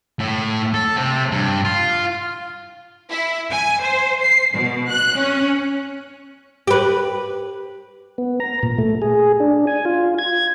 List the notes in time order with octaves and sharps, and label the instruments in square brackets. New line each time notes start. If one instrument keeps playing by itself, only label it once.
[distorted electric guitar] A2
A4
C3
G2
F4
[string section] E4
G#5
C5
C7
B2
F#6
C#4
[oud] G4 B4
[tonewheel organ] B3
A#5
A#2
A3
G#4
D4
G#5
F4
G#6